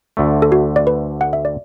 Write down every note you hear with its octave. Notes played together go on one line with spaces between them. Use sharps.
D2 D3 A3
A4
F#4
D5
B4
F#5
E5
D5